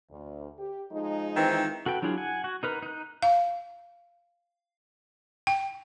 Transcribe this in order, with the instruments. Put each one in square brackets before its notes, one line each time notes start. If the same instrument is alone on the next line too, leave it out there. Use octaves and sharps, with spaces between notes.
[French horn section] D2
G4
F3 G#3 D#4
[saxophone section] D#3 E3 C4
[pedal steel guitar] F#4 A4 B4 G5
F#3 D4 E4 F4 G#4
F#5 G#5
F#4
D#4 A#4 B4
D#4 F#6
[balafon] F5
G5